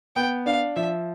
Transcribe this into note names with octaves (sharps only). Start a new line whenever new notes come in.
B3 G5
D4 F5
F3 E5